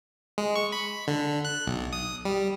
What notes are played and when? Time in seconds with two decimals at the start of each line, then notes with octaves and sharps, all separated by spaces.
0.38 G#3
0.56 C#6
0.72 B5
1.08 D3
1.45 F#6
1.67 B1
1.93 D#6
2.25 G3